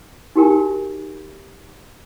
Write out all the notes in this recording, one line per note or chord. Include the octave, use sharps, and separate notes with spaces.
D#4 F#4 G4 A#4 G#5